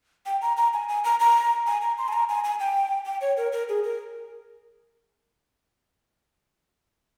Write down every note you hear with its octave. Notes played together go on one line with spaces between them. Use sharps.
G5
A#5
A#5
G#5
G#5
A#5
A#5
G#5
A#5
C6
G#5
A#5
G#5
G#5
G5
G5
C#5
A#4
A#4
G#4
A#4